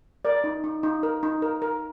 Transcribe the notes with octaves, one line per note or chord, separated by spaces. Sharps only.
A#4 D5
D#4
D#4
D#4
A#4
D#4
A#4
A#4